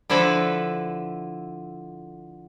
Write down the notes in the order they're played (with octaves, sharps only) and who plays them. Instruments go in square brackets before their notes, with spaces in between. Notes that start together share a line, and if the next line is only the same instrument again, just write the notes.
[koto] D3 F3 E4 A4 B4